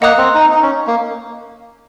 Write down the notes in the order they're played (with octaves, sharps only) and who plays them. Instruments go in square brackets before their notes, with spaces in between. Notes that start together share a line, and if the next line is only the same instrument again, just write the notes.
[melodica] A#3 [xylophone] D#5 F#5 A#5 D#6 F#6
[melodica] C4
D#4
D#4
C#4
A#3